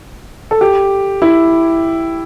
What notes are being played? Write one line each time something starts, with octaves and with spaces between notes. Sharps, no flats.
A4
G4
E4